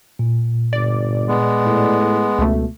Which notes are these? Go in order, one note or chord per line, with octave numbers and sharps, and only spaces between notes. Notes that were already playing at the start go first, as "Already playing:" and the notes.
A#2
G1 D5
G#3 B3
A2
C#2 B2 A3